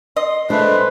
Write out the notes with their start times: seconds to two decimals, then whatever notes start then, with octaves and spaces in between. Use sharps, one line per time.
0.16 D#5 C6
0.50 G#3 A3 D4 B4 C5